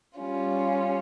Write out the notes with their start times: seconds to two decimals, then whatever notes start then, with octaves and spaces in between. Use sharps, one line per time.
0.18 G3 C#4 F4